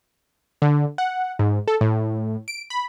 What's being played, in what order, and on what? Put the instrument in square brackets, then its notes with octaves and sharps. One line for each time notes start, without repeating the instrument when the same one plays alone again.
[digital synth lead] D3
F#5
G#2
A4
A2
D7
B5